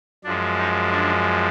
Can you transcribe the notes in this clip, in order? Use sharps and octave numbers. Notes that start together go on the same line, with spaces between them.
F#2 F3 G#3 D4
D#4
D4